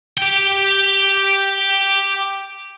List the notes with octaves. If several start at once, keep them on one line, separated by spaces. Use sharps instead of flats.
G4 G5